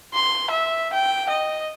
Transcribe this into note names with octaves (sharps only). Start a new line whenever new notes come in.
C6
E5
G5
D#5